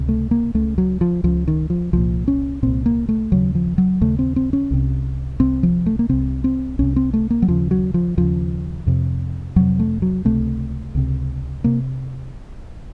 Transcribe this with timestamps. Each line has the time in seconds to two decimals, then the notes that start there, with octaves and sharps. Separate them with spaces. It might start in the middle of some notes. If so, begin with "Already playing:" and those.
Already playing: C#2 C3
0.09 A3
0.31 A#3
0.54 C#2 C#3 A3
0.78 F#3
1.01 F3
1.24 C#2 C#3 F3
1.48 D#3
1.70 F3
1.93 C2 A#2 F3
2.28 C#4
2.63 C2 A#2 C4
2.86 A#3
3.09 A3
3.32 D#2 C#3 F#3
3.55 F3
3.78 F#3
4.01 D#2 C#3 A3
4.19 C4
4.36 C4
4.53 C#4
4.71 C2 C3
5.40 C2 C3 C4
5.63 F3
5.86 A3
5.99 A#3
6.09 C2 C3 C4
6.44 C4
6.79 C2 C3 C#4
6.96 C4
7.13 A3
7.30 A#3
7.42 F#3
7.48 D#2 C#3 F3
7.71 F#3
7.94 F3
8.17 D#2 C#3 F3
8.87 F2 C3
9.56 F2 C3 F#3
9.79 A3
10.02 F#3
10.25 C#2 C3 A3
10.95 C#2 C3
11.64 C3 A#3